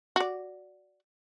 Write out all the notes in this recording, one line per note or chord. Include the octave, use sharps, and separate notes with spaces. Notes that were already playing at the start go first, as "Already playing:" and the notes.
F#4 D5